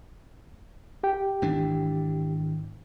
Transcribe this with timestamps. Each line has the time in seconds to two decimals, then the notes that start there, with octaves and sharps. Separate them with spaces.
1.03 G4 G5
1.42 G#1 E3 D4